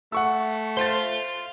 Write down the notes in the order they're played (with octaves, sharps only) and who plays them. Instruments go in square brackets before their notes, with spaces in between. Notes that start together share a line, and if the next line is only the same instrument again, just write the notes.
[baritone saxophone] A3 [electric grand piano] F#5 C#6 E6
[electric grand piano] C5 A6 [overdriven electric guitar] F5 C6